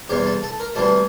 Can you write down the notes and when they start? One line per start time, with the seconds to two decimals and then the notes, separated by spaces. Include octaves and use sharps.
0.09 E2 C3 G3 G4
0.26 A4
0.43 A4
0.60 A#4
0.75 D2 C3 E3 G3 A4